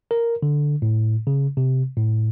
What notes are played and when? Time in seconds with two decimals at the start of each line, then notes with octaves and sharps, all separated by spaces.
0.11 A#4
0.43 D3
0.82 A2
1.27 C#3
1.57 C3
1.97 A2